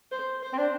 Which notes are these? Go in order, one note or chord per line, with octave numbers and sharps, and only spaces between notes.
C5
C5
C4
D4